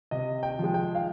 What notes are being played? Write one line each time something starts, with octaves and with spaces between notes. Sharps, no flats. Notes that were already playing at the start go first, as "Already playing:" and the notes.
C3 D#5
G5
F3 G#3
G5
F5